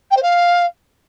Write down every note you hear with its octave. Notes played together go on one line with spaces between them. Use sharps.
G5
C5
F5